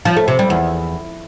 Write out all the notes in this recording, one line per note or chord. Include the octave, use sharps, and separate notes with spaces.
F3
A3
C3
G3
E2